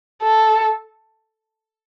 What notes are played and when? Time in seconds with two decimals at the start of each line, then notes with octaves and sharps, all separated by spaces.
0.23 A4